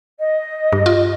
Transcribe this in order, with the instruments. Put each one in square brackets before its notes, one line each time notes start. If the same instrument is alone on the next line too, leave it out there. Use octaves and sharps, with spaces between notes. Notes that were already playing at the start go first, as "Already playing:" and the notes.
[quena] D#5
[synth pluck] G2
F4